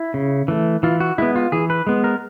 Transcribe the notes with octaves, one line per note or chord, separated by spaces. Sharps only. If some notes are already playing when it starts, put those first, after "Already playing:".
Already playing: E4
C#3
E3 A3
E3 F4
F#4
G#3 B3 E4
F4
E3 G#4
B4
G#3 B3
A#4